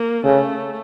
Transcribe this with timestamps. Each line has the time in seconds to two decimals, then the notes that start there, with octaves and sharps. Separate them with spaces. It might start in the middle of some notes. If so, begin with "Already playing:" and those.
Already playing: A#3
0.24 C#3 A3